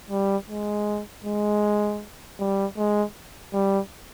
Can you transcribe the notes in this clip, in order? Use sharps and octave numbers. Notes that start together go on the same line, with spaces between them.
G3
G#3
G#3
G3
G#3
G3